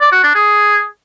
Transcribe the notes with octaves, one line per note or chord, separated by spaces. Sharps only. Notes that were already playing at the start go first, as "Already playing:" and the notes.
D5
F#4
D4
G#4